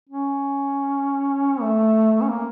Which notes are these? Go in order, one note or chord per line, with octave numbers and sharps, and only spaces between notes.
C#4
A3
C#4
A#3